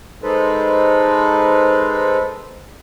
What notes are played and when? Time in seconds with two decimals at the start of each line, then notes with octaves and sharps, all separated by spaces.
0.23 G#3 D#4 A4 B4 C5